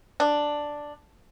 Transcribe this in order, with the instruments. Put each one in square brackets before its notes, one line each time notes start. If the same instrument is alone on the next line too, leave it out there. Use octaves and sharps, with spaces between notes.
[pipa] D4